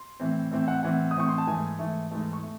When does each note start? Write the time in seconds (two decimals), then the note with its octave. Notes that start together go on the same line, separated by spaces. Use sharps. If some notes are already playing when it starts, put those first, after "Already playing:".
Already playing: C6
0.20 A2 E3 C4
0.51 A2 E3 C4
0.68 F#5
0.83 A2 E3 C4 F#5
1.11 D#6
1.15 A2 E3 C4 C#6
1.29 C6
1.38 A5
1.47 G#2 E3 A3 G#5
1.79 G#2 E3 A3
2.11 G#2 E3 A3
2.33 C#6
2.43 A3